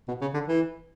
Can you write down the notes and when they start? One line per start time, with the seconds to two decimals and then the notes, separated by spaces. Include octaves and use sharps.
0.08 B2
0.21 C#3
0.34 D3
0.48 E3